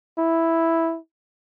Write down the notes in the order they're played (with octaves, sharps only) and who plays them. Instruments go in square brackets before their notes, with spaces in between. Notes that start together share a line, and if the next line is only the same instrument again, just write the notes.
[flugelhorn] E4